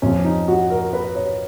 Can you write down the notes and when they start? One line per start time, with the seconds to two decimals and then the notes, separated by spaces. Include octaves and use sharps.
0.02 F2 F3 C#4
0.25 D#4
0.48 F#4
0.70 A#4
0.93 B4
1.15 C#5